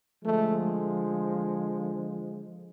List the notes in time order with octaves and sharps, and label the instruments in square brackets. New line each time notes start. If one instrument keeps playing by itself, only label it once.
[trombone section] D3 F3 G#3 A3